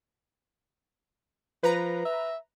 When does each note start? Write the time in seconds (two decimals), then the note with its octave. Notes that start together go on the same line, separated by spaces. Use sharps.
1.63 F3 B4 A#5
2.05 E5